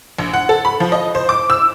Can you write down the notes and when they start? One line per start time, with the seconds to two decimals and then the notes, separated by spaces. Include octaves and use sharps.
0.19 A#1
0.34 F#5
0.49 A4
0.65 B5
0.80 F3
0.92 D#5
1.15 C5
1.29 D6
1.50 E6